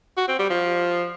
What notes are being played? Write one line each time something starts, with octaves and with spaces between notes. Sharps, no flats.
F#4
C4
G3
F3